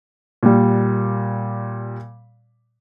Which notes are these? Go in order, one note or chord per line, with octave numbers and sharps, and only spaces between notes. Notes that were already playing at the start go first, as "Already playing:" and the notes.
A#2 G3